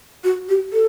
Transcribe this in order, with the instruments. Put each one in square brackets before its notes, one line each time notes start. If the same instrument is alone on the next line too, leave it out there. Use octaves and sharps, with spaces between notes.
[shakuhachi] F#4
G4
A4